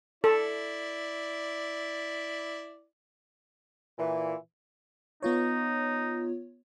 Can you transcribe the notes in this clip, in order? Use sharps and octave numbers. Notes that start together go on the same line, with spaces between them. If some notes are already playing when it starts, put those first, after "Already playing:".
E4 A4 D5
A#2 E3
B3 D#4 F4 C#5